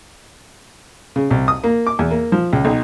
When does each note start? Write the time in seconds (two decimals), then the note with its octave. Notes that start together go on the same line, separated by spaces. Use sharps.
1.16 C#3
1.31 C2
1.48 D#6
1.64 A#3
1.87 D6
1.99 E2
2.11 A#3
2.32 F3
2.53 C#2
2.65 B1